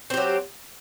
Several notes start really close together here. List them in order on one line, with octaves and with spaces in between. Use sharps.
C4 G4 F#3